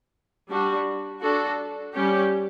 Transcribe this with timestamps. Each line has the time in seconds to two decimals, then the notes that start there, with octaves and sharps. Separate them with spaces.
0.50 G3 D4 F#4
1.22 D4 F#4 A4
1.94 G3 C#4 G4